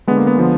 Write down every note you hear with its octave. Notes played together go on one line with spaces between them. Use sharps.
D3 G#3 B3
A#3
B3
D3 F3 G#3